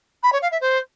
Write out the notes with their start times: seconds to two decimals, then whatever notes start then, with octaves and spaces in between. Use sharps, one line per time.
0.23 B5
0.33 C#5
0.42 F5
0.52 E5
0.61 C5